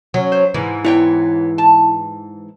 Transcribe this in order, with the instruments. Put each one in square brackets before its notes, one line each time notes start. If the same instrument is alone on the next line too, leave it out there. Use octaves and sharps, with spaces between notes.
[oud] F#3 C#4
[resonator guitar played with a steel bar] C5
[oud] G#2 E3
[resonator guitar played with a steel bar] B3 C#5 G5 [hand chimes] E4
[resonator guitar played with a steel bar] A5